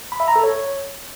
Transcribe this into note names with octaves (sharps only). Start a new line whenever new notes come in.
B5
E5
A#5
A4
C#5